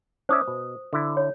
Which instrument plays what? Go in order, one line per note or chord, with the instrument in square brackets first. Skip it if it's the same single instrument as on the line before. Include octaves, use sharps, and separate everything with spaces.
[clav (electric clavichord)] C#4 D5 E5 [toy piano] C5 D#6
[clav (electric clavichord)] B2
D3 E4
[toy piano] C#5